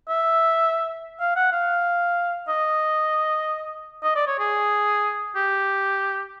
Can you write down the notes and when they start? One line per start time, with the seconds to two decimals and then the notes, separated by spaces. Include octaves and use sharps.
0.08 E5
1.20 F5
1.36 F#5
1.52 F5
2.48 D#5
4.03 D#5
4.16 D5
4.27 C#5
4.39 G#4
5.35 G4